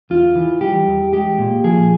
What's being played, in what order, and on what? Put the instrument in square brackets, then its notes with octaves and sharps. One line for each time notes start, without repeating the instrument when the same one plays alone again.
[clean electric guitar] E2 F4
E3
G3 G4
E2
G#3 G4
A#2
F3 G#4